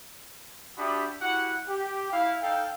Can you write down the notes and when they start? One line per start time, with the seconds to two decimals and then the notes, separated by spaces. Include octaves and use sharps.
0.76 D4 F#4 G4 E5 B5 D#6
1.20 E4 F#4 G4 F#5
1.68 G4
2.11 E4 F5
2.41 D#4 A4 F5 G5